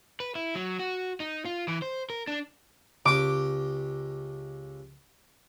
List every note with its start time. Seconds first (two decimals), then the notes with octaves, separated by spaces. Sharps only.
0.20 B4
0.35 E4
0.55 F#3
0.79 F#4
1.20 D#4
1.45 F4
1.68 E3
1.82 C5
2.10 A#4
2.28 D4
3.06 C#2 G4 D6